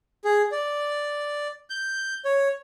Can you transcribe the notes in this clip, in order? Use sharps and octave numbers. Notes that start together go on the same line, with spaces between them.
G#4
D5
G6
C#5